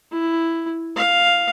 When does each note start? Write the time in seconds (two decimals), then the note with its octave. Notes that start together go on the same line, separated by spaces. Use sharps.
0.12 E4
0.96 F5